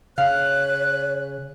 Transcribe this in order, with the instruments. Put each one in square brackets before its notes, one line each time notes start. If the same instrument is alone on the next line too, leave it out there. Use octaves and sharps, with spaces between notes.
[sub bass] C#3 [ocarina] C#5 [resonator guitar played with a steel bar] F5 [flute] F#6